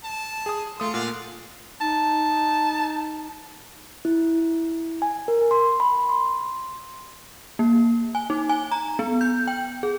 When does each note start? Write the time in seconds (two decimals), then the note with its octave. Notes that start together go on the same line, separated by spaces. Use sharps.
0.04 A5
0.46 G#4 D#6
0.80 A3 F4 D#6
0.94 A#2 F5 F#5
1.81 D#4 A5
4.05 E4
5.02 G#5
5.28 A#4
5.51 C6
5.80 B5
6.09 C6
7.59 A#3
8.15 G#5
8.30 D#4
8.49 G#5
8.72 A#5
8.99 B3
9.21 G6
9.47 G5
9.83 G#4